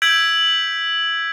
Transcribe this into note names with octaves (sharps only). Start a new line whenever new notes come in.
E6 G6 G#6 B6 D7 F#7